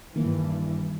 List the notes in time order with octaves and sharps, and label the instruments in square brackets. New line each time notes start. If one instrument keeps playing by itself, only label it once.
[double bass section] G2 E3 [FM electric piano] D#3 A#3